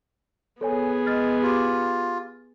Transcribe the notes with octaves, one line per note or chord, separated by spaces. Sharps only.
B3 G#4 A4 C#5 G#5
G#3 F6 A6
F4 G4 D6